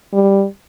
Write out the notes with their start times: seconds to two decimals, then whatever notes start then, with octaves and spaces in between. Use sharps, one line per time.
0.13 G3